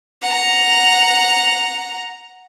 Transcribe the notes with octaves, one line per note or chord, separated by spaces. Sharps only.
F#5 A#5